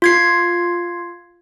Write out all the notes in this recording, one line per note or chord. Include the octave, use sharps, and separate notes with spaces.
F4 G#6 C7